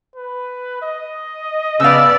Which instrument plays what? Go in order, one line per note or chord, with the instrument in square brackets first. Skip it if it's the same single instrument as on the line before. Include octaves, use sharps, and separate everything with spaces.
[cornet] B4
D#5
[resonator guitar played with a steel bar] C#3 F5 [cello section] B3 D5 [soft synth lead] E6